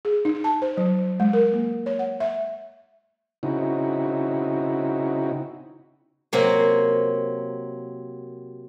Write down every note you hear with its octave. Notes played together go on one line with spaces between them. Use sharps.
G#4
D#4
A5
C5
F#3
G#3
A#4
A#3
C#5
F#5
E5
C#3 C4 D#4 E4 F#4
C3 F#3 A#3